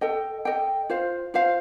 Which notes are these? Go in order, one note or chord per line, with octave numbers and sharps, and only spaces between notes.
A4 D#5 G5
A4 D#5 G5
F4 C5 F5
F4 C5 F5